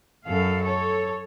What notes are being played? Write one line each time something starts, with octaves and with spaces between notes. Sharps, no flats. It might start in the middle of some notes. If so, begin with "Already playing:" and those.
F#2 A4 F5
A4 C#5